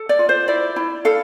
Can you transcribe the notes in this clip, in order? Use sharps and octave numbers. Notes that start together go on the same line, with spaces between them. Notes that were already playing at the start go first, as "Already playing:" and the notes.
Already playing: A4
D5
F4
C5
E4 D5
E4
A4 F5